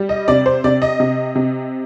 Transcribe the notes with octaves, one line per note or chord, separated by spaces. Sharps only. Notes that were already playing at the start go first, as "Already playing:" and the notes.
Already playing: G3
D#5
C3 D5
C5
C3 D5
D#5
C3
C3